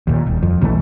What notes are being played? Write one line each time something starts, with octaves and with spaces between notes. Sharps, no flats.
D#2 A#2
D#1
F2
B1 C#3 E3 A3